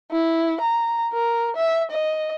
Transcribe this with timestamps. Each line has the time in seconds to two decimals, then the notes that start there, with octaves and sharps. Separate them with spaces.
0.12 E4
0.61 A#5
1.13 A#4
1.57 E5
1.91 D#5